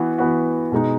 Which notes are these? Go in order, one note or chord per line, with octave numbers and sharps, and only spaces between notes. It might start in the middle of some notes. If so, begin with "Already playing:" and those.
Already playing: E3 B3 F#4
E3 B3 F#4
B2 G#3 D#4